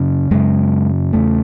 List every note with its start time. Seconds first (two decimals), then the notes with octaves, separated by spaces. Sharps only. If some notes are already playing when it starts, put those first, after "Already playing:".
Already playing: F#2 C#3
0.31 F#2 C#3 G#3
1.13 E2 C#3 A3